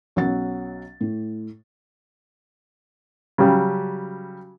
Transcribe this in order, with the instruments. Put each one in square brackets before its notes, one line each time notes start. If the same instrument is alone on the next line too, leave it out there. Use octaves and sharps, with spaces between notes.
[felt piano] B1 F#3 C#4 F#5 A6
A2
[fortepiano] C#3 F#3 G3